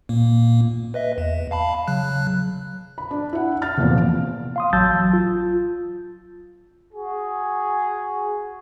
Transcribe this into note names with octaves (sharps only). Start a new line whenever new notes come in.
A#2 A#3
B4 D#5 E5
E2
F5 A5 B5
C#3 F#3 F#6
B5
D4
E4 F#5
F6 A6
F1 E2 A#2 F3
F5 C6 D#6
A1 F#3 A5 E6 G6 A6
F4
F#4 G#4